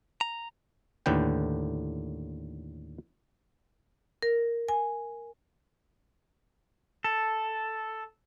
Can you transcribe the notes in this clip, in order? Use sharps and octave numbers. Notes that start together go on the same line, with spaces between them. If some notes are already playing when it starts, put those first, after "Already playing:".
A#5
D#2 A2 D3 B4 G5
A#4
G#5
A4